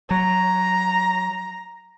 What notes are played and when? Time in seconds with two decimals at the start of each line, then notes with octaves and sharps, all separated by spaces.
0.11 F#3 A#5